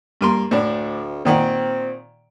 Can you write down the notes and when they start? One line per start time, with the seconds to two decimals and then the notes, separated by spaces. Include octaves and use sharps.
0.21 G2 A#3 C6
0.51 D2 A2 D4
1.25 A#2 D#3 C4 F#5